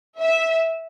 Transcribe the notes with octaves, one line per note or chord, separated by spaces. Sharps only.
E5